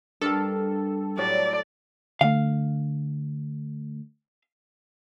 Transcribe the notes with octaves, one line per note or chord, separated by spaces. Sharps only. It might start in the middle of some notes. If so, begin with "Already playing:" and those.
G2 G3 D4 A4 A#4 F5
A2 F#3 G3 D5
D3 A3 F5